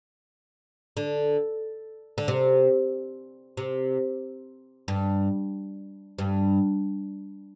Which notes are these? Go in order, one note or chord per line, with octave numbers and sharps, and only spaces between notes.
D3
D3
C3
C3
G2
G2